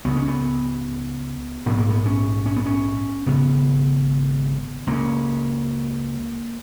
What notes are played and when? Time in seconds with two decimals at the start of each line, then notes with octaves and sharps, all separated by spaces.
0.05 C#2 C#3 B3
0.17 C#4
0.28 B3
1.66 A#1 G#2 B3
1.78 A#3
1.90 B3
2.06 C#4
2.46 C#4
2.56 B3
2.66 C#4
3.26 G#1 F#2 C#3 B3
4.87 C#2 C#3 A#3